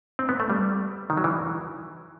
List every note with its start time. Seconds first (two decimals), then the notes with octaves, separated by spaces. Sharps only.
0.19 C4
0.29 B3
0.40 A3
0.50 G3
1.10 D#3
1.17 F#3
1.24 E3